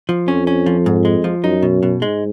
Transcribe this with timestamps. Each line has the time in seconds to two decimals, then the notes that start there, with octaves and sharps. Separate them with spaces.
0.09 F3
0.28 F2 C#4
0.47 C#4
0.66 F3
0.86 G#2
1.05 G#3
1.24 F3
1.43 F#2 D#4
1.63 B2
1.83 B2
2.01 G#2 G#3